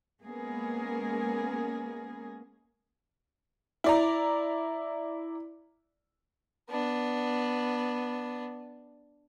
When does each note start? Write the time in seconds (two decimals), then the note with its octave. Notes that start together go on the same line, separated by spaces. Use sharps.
0.23 G#3 A#3 B3 C#4 G#4 A#4
3.84 E4 D5 A#5
6.70 B3 D4